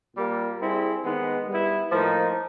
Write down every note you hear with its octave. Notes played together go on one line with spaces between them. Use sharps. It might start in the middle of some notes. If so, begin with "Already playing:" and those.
A#2 G3 A#3
G3 C4 E4 G#4
D#3 G#3 B3
G3 B3 E4
A2 F3 A#3 D#4